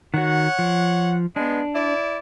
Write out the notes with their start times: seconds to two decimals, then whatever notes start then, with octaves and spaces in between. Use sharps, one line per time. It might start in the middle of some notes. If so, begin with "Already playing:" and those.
0.14 D#3 F#4 C#5 F#5
0.59 F3
1.36 G#3 B3 D4
1.74 E4 D5